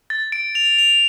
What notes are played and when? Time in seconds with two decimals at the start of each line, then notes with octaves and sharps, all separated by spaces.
0.10 A6
0.32 D7
0.55 F7
0.78 F7